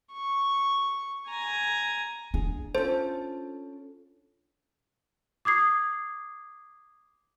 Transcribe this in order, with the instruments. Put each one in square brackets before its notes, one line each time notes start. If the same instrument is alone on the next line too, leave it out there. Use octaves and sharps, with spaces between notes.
[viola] C#6
G#5 A#5
[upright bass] D4 [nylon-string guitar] G#4
[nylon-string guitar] C#4 F4 A4 [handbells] C5
[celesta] D6 D#6 G#6 C7